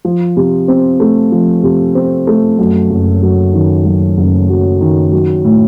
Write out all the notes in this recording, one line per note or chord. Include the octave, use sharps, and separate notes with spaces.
F3
C3
C4
A3
F3
C3
C4
A3
F#2
F#1
F#3
D#3
F#2
F#1
F#3
D#3
F#3
A2